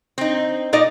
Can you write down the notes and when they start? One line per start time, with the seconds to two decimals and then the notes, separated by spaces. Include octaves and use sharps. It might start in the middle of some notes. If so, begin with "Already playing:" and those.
0.18 C4 D#4
0.73 A#2 D#4 D5 D#5